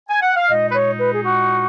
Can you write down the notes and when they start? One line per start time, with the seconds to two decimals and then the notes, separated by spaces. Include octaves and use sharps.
0.09 G#5
0.22 F#5
0.36 F5
0.49 A#2 G#3 D#4 D#5
0.70 B4
0.75 C#5
1.00 B4
1.15 G#4
1.25 F#4